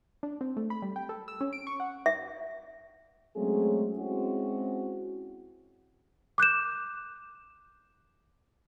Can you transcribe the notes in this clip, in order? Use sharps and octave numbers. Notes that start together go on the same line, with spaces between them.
D4
C4
A3
B5
G3
G5
A4
E6
C#4
D7
C#6
F#5
E5
F#3 G#3 A3 C4 C#4 G#4
G#3 C4 C#4 E4 F#4
D6 F#6 G6 E7